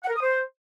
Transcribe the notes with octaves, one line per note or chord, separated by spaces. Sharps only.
F#5
A#4
D#6
C5